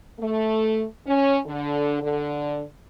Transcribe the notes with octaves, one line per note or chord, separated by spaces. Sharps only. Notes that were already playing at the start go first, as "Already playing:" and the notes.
A3
C#4
D3
D3